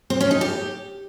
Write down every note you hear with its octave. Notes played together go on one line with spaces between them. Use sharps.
C4
C#4
D#4
G4